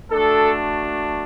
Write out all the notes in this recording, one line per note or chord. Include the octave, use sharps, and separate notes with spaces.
A3 D4 F#4 A4